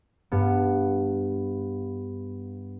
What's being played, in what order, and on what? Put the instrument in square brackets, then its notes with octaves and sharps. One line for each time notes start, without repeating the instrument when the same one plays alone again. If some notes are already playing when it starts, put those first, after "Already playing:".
[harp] G2 B3